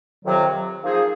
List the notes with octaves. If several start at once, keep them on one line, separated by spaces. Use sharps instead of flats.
F2 C3 D#3 F#3
F3 A#3 D#4 G#4 C5